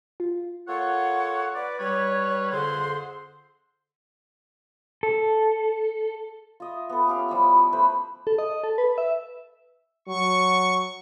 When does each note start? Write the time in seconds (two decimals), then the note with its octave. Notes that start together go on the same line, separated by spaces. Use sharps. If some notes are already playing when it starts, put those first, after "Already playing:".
0.20 F4
0.68 A#3 F4 A4 C#5 F#5
1.55 B4 D5
1.79 G3 B4 C#5
2.52 F2 D3 G#4 C5 F#5 C6
5.03 A4
6.60 F4 D#5 E5
6.89 B3 A4
7.07 C#4 G4 F5
7.29 F3 G3 E4 E6
7.73 A3 B4 C5 B5
8.27 A4
8.38 D#5
8.64 A4
8.78 B4
8.98 E5
10.08 F#3 C#6